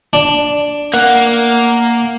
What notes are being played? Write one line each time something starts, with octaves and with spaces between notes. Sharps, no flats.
D4
A#3 F#5